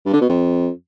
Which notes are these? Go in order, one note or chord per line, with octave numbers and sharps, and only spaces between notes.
G2
D3
B2
F2